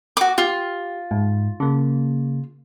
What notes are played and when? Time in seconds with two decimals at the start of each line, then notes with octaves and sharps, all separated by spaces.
0.17 F#4 D6
0.38 F4 G4
1.11 G#2
1.60 C#3 A#3